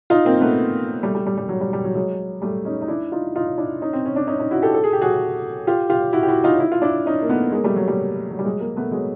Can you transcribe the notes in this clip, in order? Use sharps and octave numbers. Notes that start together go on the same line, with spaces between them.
D#4 F4
A#3 C4
A3 B3
G3 A3
G3
G3
G3
F#3
G3
G3
F#3
F#3 G#3
G3 A3
C#4 D#4
D#4
D4 E4
D#4 F4
D#4 F4
D4 E4
C#4 D#4
C4
C#4
D4
C#4 D#4
C#4 D#4
E4 F#4
G4 A4
A4
G#4
G4
F#4 G#4
F4 G4
F4 G4
E4 F#4
G4
E4 F#4
D#4 F4
E4
F4
D4 E4
C#4 D#4
A#3
A3 B3
G#3 A#3
G3 A3
F#3
G3
F#3
G3
F#3 G#3
G#3 A#3
A3 B3
F#3 G#3